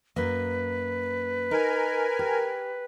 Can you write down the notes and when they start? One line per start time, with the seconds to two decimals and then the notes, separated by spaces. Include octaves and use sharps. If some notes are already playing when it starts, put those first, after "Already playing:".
0.16 F#2 A#3 B4
1.51 D#4 A#4 G#5
2.19 G4